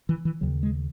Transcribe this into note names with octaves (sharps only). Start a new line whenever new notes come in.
E3
E3
D#2 C#3 F#3
G#3